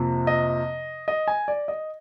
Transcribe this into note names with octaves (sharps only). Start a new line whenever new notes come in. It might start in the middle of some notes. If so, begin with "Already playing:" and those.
Already playing: F2 C3 F3 A#3
D#5
D#5
G#5
D5
D#5